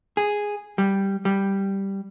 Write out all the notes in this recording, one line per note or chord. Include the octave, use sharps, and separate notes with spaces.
G#4
G3
G3